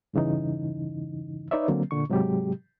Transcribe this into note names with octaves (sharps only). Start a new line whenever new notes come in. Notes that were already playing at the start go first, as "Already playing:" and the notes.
E2 G2 C#3 E3 D#4
D#4 B4 C#5 D5 E5
D3 F#3 A#3 C4
A#2 D3 C#6
G#2 C3 F#3 G#3 G4